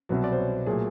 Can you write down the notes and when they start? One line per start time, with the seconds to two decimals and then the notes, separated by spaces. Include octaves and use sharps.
0.09 C2 B2 F#3
0.24 D5
0.32 C5
0.38 C#5
0.66 A#2 F#3 A3 G#4